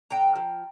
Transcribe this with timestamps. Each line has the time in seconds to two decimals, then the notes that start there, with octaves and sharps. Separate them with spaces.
0.10 D3 G5 A#5
0.35 F3